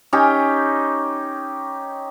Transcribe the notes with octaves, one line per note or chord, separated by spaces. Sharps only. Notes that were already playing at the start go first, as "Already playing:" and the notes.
C#4 D#4 G4